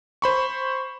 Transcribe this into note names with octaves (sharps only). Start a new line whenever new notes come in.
C5 B5 C#6